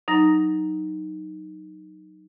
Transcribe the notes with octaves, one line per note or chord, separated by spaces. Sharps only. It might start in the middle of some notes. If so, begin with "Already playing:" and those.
F#3 D#4 A#5 A#6